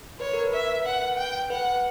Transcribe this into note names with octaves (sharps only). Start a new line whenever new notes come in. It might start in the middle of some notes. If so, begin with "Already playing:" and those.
B4 C#5
A#4
B4
E5
F#5
G5
B4 F#5